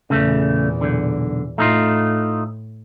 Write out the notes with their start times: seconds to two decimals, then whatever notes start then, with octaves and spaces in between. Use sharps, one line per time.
0.10 E2 A#2 C#3 A3
0.81 B1 D3
1.58 A2 A3 D#4 F4